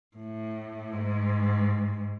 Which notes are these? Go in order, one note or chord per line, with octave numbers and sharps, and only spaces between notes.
A2
G#2